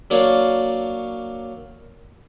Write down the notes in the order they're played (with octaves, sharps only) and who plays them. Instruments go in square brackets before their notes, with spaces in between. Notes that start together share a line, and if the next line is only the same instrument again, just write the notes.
[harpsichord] F#3 A#3 D4 C#5 D5 F5